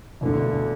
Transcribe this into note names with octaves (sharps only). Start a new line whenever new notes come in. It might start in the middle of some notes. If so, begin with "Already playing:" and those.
E1 D2 D3